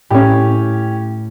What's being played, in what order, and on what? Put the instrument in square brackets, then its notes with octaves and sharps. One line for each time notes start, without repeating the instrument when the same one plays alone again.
[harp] A2 [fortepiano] C#4 G4